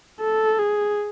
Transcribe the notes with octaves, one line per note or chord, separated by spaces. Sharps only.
A4
G#4